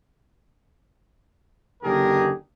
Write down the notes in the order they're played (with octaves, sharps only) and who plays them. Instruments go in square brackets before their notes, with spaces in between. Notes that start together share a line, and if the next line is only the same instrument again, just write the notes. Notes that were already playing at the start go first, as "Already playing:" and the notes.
[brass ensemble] F#1 D#2 D3 G4 G#4 A#4